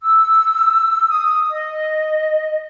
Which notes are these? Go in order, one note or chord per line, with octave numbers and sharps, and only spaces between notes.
E6
D#6
D#5